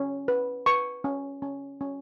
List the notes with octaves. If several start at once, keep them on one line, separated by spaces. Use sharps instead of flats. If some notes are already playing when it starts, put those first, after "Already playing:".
Already playing: C#4
B4
B4 C#6
C#4
C#4
C#4